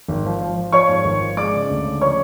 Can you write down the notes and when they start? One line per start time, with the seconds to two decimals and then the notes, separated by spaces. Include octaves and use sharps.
0.08 G#1
0.26 F3
0.41 F3
0.57 F3
0.72 F3 C#5 C#6
0.89 G#2
1.05 G#1
1.21 F3
1.37 G#3 D5 D6
1.53 C#3
1.70 D2
1.85 C#3
2.01 F3 C#5 C#6